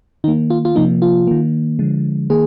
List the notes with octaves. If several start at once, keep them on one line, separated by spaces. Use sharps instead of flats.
D#3 A#3 D#4
F4
F4
C3 F3 A#3 D#4
F4
D#3 A#3
D3 F3 G#3
D#3 A#3 G#4